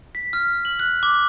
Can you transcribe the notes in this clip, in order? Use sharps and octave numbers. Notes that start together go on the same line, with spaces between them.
B6
F6
F#7
F#6
D6